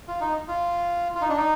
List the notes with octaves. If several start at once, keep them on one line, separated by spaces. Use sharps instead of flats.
F4
D#4
F4
F4
D#4
D4
D#4